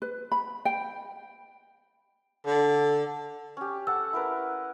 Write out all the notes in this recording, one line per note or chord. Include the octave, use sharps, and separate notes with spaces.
B4
B5
G5
D3
C#4 G4
A4 F#5 A5 E6
E4 A#4 B4